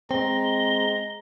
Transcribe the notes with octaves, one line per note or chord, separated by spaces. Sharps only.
G#3 C4 A#5 G7